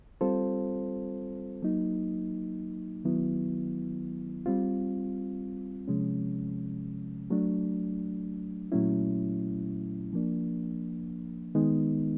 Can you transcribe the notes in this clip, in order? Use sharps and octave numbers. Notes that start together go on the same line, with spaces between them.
G3 C4 F4 A4 C5
F#3 A#3 D#4
D#3 F#3 B3 E4
G3 C4 F4
C3 F3 G#3 C#4
F#3 A3 D4
A#2 F#3 A3 C#4 E4
F3 A#3 D4
D#3 G#3 B3 D#4